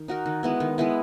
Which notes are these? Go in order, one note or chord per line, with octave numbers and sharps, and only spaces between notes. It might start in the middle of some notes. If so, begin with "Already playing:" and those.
Already playing: D#3
D#4 F#4 A#4
D#3
G#3 B3 E4
D#3
G#3 B3 E4